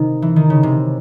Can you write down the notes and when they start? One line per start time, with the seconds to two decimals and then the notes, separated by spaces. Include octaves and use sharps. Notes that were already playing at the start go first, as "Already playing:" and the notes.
Already playing: C3 D#3
0.22 E3
0.36 D#3
0.50 C#3
0.63 C3